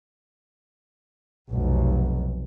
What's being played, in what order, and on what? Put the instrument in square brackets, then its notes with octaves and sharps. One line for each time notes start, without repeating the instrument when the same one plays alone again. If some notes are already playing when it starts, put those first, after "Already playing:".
[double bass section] F1 B1